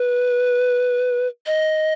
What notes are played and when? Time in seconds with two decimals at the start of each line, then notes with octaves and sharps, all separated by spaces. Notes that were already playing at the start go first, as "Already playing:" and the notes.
Already playing: B4
1.46 D#5